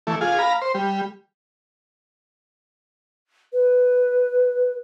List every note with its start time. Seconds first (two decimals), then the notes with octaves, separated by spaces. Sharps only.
0.07 E3 A3
0.21 F4 G#4
0.39 F5 A#5 B5
0.62 C5
0.74 G3
3.53 B4